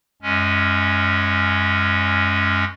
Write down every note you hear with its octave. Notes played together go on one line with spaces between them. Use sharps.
F#2 G#3 C#4